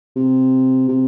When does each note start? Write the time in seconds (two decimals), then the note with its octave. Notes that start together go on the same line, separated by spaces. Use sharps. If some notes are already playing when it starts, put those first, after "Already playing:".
0.16 C3
0.89 C3